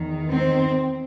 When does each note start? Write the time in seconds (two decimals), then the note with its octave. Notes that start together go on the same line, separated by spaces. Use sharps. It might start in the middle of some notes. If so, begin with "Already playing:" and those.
Already playing: E2 D#3
0.31 C4